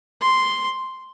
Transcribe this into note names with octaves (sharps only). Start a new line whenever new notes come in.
C6